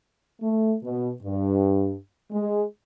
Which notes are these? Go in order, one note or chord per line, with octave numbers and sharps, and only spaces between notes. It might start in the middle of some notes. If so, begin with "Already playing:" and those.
A3
B2
G2
G#3